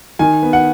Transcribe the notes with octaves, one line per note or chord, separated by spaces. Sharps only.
D#3 G#5
B3
F#5